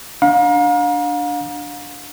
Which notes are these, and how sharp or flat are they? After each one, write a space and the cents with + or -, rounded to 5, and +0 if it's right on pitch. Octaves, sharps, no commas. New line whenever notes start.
D4 +0 F5 +40 A#5 +35